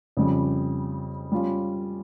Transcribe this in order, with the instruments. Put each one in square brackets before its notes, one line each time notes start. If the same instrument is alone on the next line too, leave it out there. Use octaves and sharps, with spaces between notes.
[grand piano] F2 C#3 G3
G3 C#4 F4